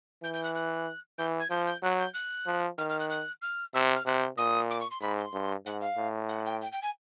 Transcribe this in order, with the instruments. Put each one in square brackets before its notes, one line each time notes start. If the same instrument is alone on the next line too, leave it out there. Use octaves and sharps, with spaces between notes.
[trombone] E3 [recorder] G6
[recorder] G6
F#6
F#6
[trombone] E3 [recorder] G6
[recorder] G#6
[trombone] F3 [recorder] G6
[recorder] G6
[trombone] F#3 [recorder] F#6
[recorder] G6
F#6
[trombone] F3
[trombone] D#3 [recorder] F6
[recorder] F6
F#6
F#6
F6
[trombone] C3 [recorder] E6
[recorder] F6
[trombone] C3 [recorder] F#6
[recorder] G6
[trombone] A#2 [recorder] D#6
[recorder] D6
C#6
C6
[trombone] G#2 [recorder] B5
[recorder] C6
[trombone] G2
[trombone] G#2 [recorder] F#5
[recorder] F5
[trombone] A2
[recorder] F#5
G5
G5
G5
G#5